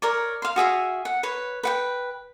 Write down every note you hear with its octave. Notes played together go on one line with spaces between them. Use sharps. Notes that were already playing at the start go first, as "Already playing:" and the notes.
A#4 C#5 D5
F5 C6
F#4 G#4 E5 F5
F#5
B4 C#5
B4 F#5 G5